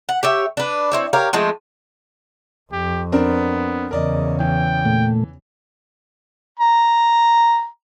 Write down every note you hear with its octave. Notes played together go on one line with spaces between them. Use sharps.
F#5
G4 C#5 E5
D4 B4
C4 E4 C#5
G4 A#4 C#5 F5
F3 G#3 A3 C4
F2 G4
B3 C4 D4 A#4
E2 C#3 A#4 D5 D#5
E3 G5
A#2 A3
A#5